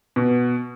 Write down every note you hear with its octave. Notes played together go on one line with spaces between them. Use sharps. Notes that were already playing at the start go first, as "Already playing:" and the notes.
B2